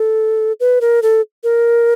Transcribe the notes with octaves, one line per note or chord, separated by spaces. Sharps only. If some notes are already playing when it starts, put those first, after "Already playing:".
Already playing: A4
B4
A#4
A4
A#4